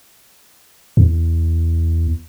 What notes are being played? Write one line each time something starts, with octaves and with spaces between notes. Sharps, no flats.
E2